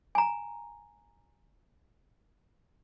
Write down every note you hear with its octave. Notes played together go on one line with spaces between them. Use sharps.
G#5 A#5